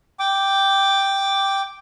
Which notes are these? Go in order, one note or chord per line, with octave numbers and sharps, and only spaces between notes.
G5 D6